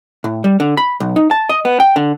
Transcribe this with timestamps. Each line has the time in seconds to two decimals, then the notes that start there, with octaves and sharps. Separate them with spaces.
0.24 A2
0.44 G3
0.60 D3
0.77 B5
1.00 B1
1.16 D#4
1.31 A5
1.49 D#5
1.65 B3
1.80 G5
1.96 D3